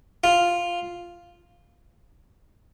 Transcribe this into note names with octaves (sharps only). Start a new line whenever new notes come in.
F4